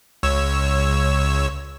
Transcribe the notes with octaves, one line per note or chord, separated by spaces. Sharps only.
C#2 C#5 E6